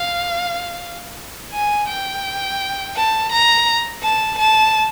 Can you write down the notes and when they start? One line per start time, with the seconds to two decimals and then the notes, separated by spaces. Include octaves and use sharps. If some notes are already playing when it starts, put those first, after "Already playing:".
Already playing: F5
1.52 G#5
1.89 G5
2.96 A5
3.32 A#5
4.03 A5
4.39 A5